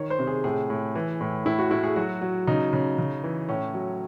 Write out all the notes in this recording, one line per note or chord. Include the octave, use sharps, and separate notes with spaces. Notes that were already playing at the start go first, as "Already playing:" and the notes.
Already playing: D#3 C#5
C5
C3
G#4
A2 G#4
A2
E3
A2
A2 E4
F#4
A2 E4
G#4
F#3 F#4
F#3
C#3 D#4
C#3
C#3
E3
A2 C#4
F#3